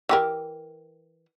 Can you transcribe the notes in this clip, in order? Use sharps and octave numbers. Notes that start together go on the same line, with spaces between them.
E3 G4 A#4